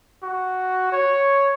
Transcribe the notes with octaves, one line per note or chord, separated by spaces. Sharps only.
F#4
C#5